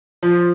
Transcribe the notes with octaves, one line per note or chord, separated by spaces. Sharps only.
F3